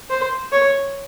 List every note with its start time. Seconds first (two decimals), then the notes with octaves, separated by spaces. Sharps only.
0.10 C5
0.52 C#5